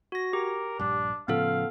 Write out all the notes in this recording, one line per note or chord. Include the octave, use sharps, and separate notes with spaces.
F#4 A#6
G4 A#4
A#1 G2 D4
A2 C#3 F3 B3 A4 F5